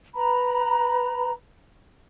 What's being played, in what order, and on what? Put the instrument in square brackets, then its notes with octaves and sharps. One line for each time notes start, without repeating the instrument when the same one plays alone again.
[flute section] B4 A#5 B5